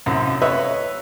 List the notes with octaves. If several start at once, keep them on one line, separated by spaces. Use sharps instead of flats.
C2 F#2
B4 C#5 D#5 E5